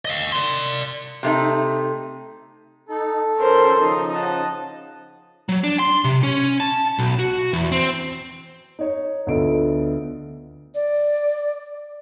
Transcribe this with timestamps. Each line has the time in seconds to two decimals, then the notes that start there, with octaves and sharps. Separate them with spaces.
0.05 D#5 F5
0.32 D5 C6
1.23 C3 A3 D#4
2.89 D#4 A4
3.38 D#3 F3 C#4 A#4 C5 C6
3.80 C#3 F3 D#4
4.13 D#5 F#5 A5
5.49 F#3
5.64 D4
5.79 C6
6.04 C3
6.23 C#4
6.60 A5
6.99 B1
7.19 F#4
7.53 E2
7.72 C4
8.79 D#4 C#5
9.27 D2 B3 F4 A4 D#5 D7
10.75 D5